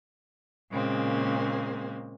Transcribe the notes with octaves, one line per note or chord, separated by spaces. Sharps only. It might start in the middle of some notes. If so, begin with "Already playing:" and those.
A#2 C#3 G#3 A#3 C4